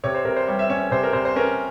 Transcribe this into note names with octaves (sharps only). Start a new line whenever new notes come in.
C3 C#5
C5
C3 A#4
C5
G3 C#5
E5
C#4 C#5
C3 C5
A#4
C3 C5
C5
C#4 A#4